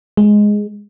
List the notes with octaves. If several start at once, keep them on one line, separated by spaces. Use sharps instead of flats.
G#3